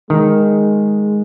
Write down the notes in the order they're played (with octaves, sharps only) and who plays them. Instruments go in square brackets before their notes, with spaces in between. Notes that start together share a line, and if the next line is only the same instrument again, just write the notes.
[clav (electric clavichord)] D#3 [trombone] G#3